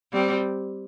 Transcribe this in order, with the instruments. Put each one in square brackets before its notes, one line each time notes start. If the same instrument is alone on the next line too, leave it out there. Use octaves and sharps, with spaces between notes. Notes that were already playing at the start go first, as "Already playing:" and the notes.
[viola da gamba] G3 C4